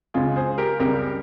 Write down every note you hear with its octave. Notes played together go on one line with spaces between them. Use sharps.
C#2 C#3 G#3 F4 G#4
G#4 C5
G4 A#4
C#2 C#3 G3 G4 A#4